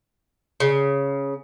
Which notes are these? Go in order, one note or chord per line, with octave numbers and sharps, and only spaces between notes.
C#3